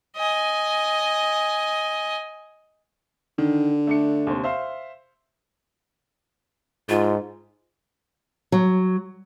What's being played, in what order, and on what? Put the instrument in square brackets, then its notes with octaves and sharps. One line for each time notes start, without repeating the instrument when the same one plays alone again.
[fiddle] D#5 G#5
[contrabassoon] D3 [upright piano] D#3
[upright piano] A3 D4 C#7
D#2 C3 C5
C5 E5 F5
[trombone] G#2 [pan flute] F4
[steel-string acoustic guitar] F#3